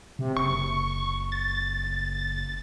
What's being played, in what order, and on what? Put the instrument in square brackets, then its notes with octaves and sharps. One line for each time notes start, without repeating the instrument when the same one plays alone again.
[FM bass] C3
[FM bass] F#1 [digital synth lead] C#6
[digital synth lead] A6